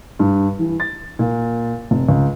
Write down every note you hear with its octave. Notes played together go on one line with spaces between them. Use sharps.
G2
E3
A6
A#2
F1
C#2